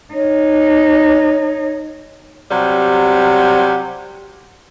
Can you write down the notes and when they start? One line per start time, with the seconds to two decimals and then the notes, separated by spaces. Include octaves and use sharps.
0.14 D#4 C#5
2.51 C3 F#3 G3